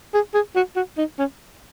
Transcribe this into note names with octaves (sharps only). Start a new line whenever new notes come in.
G#4
G#4
F#4
F#4
D#4
C#4